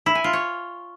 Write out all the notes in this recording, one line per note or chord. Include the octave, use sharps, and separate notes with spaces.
E4
G#5
F4
C#5